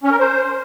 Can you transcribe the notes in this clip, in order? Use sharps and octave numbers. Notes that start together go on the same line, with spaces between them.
C#4
A#4
C5